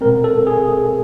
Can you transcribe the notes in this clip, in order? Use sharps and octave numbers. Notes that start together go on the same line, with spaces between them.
B2 G#3 C4 A#4
A4
G#4